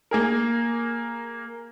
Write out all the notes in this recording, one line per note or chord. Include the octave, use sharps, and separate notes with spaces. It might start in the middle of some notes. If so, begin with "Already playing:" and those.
A#3 G#4 A#4